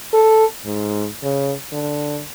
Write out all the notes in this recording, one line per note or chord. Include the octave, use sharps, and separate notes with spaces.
A4
G#2
C#3
D3